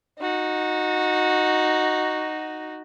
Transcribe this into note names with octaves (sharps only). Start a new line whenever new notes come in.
D#4 F#4